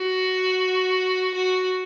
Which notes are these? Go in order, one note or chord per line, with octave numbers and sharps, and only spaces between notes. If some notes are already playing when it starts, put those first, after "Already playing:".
Already playing: F#4
F#4